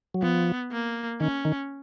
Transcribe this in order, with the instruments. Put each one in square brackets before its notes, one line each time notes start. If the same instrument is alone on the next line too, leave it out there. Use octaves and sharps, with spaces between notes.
[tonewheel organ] F#3
[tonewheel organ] F3 [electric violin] B3
[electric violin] A#3
[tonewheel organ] D#3 [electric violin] C#4
[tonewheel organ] D#3